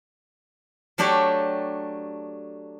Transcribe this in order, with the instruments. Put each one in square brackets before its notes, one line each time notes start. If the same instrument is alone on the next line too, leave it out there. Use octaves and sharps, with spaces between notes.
[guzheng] F#3 A3 D4 G4 C#5